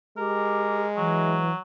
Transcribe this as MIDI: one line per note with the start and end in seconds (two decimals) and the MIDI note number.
0.17 1.44 56
0.17 0.84 67
0.17 0.87 70
0.97 1.52 52
0.97 1.60 54